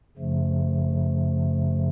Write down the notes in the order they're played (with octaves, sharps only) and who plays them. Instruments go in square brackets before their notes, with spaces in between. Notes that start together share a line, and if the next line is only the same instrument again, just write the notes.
[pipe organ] F#2 C#3 F3 A3